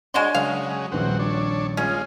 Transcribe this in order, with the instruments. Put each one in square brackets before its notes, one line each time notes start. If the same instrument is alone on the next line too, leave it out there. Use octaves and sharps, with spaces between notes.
[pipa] G#3 F#4 C6 [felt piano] D4 C#5 G#5
[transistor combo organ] C#3 F#3 G#3 [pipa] F5
[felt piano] D#1 A#1 B4 [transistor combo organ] C4 F#4
[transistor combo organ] D4 C#5
[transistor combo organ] G#3 F4 [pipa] C#4